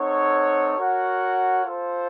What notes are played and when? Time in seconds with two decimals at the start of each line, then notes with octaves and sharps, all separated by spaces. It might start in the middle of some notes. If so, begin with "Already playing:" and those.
Already playing: C4 D#4 A4 C#5 F#5
0.77 F#4 A#4 C#5 F#5
1.65 F4 A4 C5